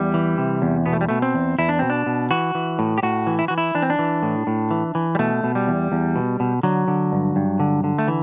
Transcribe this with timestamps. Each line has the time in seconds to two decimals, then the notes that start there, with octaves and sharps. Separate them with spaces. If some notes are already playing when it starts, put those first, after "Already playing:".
Already playing: E2 G3
0.14 E3
0.38 C3
0.62 E2
0.86 B2 B3
0.93 A3
1.01 G3
1.09 B2 A3
1.22 C4
1.34 E2
1.58 E2 E4
1.69 D4
1.79 B2 C4
1.90 D4
2.06 B2
2.31 E3 F#4
2.55 E3
2.79 A2
2.98 G4
3.03 A2 F#4
3.27 E3
3.39 E4
3.48 E3 F#4
3.58 E4
3.75 E3 D4
3.82 C4
3.90 D4
3.99 E3
4.23 A2
4.47 A2
4.71 E3
4.95 E3
5.15 G3
5.19 B2 A3
5.44 B2
5.55 G3
5.68 E2
5.92 E2
6.16 B2
6.40 B2
6.63 D3 F#3
6.88 D3
7.12 G2
7.36 G2
7.60 D3
7.84 D3
7.99 A3
8.08 E3